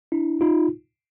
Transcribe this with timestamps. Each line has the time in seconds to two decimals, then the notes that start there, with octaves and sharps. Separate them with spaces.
0.12 D4 E4
0.41 D#4 F4